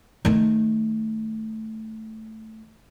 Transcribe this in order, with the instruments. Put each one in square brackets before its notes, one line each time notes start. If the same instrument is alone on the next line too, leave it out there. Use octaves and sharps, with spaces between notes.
[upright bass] D#3 A3